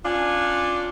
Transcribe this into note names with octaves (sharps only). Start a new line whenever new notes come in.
C#4 D4 F4